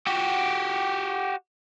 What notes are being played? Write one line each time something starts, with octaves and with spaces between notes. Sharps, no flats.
F#4 G4